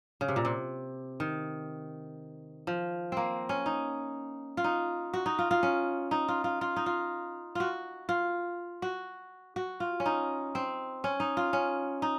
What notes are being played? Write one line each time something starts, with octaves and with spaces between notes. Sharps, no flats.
C#3
C3
A#2
C3
D#3
F3
A#3 C4
C#4
D#4
F4
D#4
F#4
D#4
F4
F4
C#4
D#4
F4
F4
F4
D#4
F4
F4 F#4
F4
F#4
F#4
F4
C#4
D#4
C4
C#4
D#4
F4
C#4
D#4